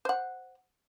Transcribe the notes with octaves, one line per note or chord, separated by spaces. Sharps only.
C5 F#5